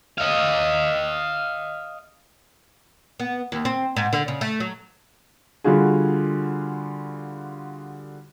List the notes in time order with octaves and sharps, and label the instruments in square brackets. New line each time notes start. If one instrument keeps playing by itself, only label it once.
[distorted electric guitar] D#5 F5
[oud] B3
D#2
C4
G#2
D3
C#3
A3
F#3
[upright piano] D3 G3 F4 F#4 G#4